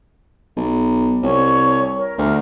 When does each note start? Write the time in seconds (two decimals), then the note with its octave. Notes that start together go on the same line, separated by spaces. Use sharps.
0.57 B1
1.23 C2 C#5
1.97 A#4
2.18 D2 A#4